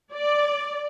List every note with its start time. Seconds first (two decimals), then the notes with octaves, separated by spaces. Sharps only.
0.13 D5